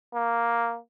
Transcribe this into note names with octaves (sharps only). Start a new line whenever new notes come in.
A#3